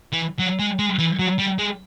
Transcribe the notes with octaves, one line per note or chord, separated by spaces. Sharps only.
E3
F#3
G#3
G#3
E3
F#3
G3
G#3